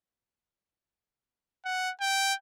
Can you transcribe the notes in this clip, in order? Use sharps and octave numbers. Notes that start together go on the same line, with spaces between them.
F#5
G5